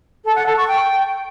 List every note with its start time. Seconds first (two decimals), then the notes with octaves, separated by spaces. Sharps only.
0.24 A4
0.35 F#5
0.46 A4
0.57 C#6
0.67 G5